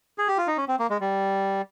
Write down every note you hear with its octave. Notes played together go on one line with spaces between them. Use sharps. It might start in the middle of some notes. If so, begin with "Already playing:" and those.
G#4
G4
F4
D#4
C#4
C4
A#3
G#3
G3